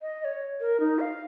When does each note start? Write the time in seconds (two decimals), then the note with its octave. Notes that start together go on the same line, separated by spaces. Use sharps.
0.02 D#5
0.21 D#5
0.24 C#5
0.60 A#4
0.80 D#4
1.00 F5